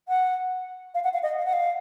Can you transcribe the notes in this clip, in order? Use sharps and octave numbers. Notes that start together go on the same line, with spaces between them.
F#5
F5
F#5
F5
D#5
F5
F#5
F5